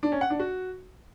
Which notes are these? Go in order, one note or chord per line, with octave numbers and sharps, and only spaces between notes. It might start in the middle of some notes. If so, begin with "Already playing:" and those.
D4
C#4
F#5
D4
F#4